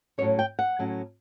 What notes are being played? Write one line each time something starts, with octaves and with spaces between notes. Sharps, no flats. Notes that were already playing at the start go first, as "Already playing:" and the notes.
A2 F#3 C#4 C#5
G5
F#5
A2 F#3 C#4